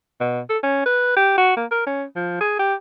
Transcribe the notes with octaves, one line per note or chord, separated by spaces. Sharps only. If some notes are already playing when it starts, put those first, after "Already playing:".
B2
A4
C#4
B4
G4
F#4
A#3
A#4
C#4
F3
G#4
G4